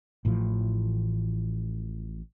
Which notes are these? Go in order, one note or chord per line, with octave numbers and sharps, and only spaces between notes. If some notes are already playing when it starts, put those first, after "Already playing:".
A1 A2 E3 F3